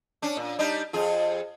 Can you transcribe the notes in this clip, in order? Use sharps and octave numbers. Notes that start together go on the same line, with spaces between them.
C#4 D4
A#2
G3 D4 D#4
F2 F4 G#4